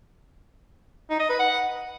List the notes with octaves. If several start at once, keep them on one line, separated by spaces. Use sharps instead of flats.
D#4
D#5
B4
F#5